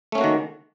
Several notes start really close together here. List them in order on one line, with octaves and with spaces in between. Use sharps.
A3 C#4 A#3 F#4 D#3